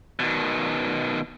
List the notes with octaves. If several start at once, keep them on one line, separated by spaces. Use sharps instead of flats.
B2 D#3